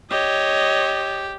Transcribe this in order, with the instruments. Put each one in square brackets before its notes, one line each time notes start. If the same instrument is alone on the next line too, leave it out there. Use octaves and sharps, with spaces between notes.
[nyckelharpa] G4 [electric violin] C#5 D#5